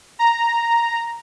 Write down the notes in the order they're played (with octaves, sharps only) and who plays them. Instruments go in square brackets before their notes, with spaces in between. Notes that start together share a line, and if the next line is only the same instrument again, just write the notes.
[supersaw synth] A#5